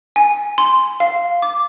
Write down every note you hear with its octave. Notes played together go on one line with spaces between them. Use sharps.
G#5
C6
F5
D6